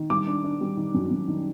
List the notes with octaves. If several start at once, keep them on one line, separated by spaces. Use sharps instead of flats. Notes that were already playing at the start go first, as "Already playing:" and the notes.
Already playing: D#3
G3 D6
D4
D4
G3
D#3
F#2
F#2
D#3